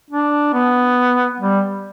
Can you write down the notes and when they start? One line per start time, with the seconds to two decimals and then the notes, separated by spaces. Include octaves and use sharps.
0.10 D4
0.53 B3
1.40 G3